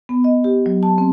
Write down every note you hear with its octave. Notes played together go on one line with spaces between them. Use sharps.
B3
D#5
G4
F#3
A5
C4